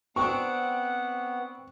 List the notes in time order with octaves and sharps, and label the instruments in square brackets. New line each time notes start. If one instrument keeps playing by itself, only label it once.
[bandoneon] B3 [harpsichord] C4 D4 [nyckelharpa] F#5 [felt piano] C#6